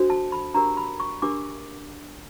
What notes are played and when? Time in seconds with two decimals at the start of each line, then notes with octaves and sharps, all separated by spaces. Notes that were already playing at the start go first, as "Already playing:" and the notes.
Already playing: D4 F#4 A4 C5
0.10 A5
0.32 B5
0.54 D4 G4 A#4 A#5
0.77 B5
1.00 C#6
1.22 D4 G4 A#4 D6